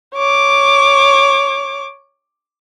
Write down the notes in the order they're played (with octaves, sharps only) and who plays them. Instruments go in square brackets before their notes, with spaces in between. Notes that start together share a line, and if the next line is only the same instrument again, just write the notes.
[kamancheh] C#5 D6